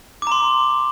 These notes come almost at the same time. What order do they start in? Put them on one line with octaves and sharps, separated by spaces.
D6 A#5 C6